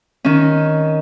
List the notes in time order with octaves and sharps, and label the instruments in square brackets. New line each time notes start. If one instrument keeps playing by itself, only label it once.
[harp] D#3 C#4